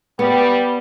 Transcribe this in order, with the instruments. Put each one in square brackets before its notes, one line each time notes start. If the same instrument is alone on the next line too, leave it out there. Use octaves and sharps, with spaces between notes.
[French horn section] G3 [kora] B3